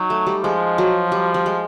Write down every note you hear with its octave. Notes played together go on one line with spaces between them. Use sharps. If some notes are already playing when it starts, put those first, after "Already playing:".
Already playing: F#3 D#4
A3
G3
F3 G#3
F#3
G3
G3
G#3